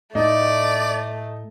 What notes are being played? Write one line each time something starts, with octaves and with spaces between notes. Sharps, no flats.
A2 A3 D#4 D5